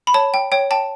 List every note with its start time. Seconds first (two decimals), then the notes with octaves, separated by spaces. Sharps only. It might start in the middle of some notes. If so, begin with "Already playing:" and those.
0.07 B5
0.14 C#5 A5
0.34 G5
0.52 C#5 G5
0.71 G5 A5